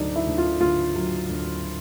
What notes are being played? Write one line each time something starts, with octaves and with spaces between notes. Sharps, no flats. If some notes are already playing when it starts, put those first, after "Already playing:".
Already playing: D2 D3 F#3 D4 D#4
E4
D2
F4
D3 F4
F#3
D2